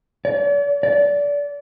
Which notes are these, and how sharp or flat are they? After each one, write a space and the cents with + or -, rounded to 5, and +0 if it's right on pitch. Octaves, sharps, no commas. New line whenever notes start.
D5 -45
D5 -25